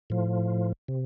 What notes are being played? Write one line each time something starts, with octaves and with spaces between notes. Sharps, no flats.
A2 F3
C3